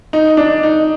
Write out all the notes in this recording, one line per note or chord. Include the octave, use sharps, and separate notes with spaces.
D#4
D4
D#4